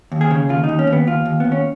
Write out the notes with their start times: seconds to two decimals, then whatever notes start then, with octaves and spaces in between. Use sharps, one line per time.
0.12 D#2
0.21 G#4
0.31 C#3
0.49 D#2 F4
0.64 D#4
0.69 D#2
0.79 C#4
0.87 D#2
0.93 B3
1.07 D#2 F4
1.25 D#2
1.40 D#2 B3
1.52 C#4